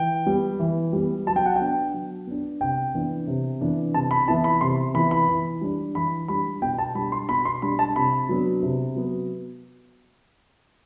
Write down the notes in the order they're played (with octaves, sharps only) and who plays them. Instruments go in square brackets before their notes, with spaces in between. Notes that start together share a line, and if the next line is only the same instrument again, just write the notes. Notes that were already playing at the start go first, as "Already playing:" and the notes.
Already playing: [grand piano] E3 G5
G3 B3
E3
G3 B3
F#3 A5
G5
F#5
B3 D4 G5
F#3
B3 D4
C3 G5
E3 B3 D4
C3
E3 B3 D4
C3 A5
B5
E3 B3 E4 A5
B5
C3 C6
E3 B3 E4 B5
B5
E3
G3 D4
E3 B5
G3 D4 B5
B2 G5
A5
G3 D4 B5
C6
B2 B5
C6
G3 D4 B5
A5
C3 B5
F#3 B3 D4
C3
F#3 B3